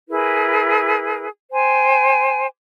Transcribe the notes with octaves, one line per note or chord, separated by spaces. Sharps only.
E4 G#4 A#4 B4
C5 G5 G#5